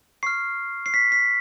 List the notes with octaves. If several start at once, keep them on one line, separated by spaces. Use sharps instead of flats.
C#6 F6 C7
C7
B6
B6